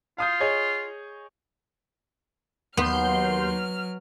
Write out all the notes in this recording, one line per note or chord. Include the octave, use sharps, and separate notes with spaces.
F4 F5 D#6 G6
G#4 C#5 D#5
D#2 F#3 B3 C6 F6 G6